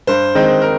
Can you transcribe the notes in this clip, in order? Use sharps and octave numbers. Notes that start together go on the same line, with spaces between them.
G2 C5
D#3 G#3 C4 D#4
A#4